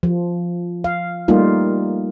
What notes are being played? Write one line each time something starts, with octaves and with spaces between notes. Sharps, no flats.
F3
F5
G3 A3 A#3 D#4 F4